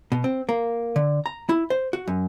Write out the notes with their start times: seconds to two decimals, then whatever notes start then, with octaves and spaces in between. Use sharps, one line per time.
0.12 B2
0.24 C4
0.49 A#3
0.96 D3
1.26 A#5
1.49 E4
1.70 C5
1.93 F#4
2.08 F#2